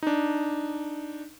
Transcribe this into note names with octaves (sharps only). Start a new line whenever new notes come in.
D4 D#4